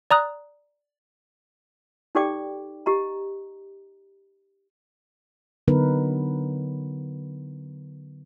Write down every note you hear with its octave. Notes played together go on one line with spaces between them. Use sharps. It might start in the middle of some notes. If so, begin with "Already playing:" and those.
D5 A#5 D#6 F#6
D#4 G4 A4 D5 G5 D6
G4 D#5 A#5
D3 F#3 B3 D#4 A#4 B4